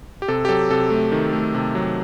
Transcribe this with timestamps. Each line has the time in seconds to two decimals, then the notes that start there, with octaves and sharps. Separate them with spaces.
0.22 G4
0.28 C3 A4
0.45 G4
0.49 F#3 A4
0.71 C3 A4
0.90 A3
1.12 D#3
1.33 A3
1.54 C3
1.75 F#3